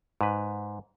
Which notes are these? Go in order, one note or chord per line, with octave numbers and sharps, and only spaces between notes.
G#2 B4